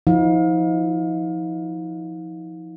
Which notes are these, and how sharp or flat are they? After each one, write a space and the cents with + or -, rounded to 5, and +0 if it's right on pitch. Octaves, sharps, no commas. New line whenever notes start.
F3 +0 D#4 +45 F5 +30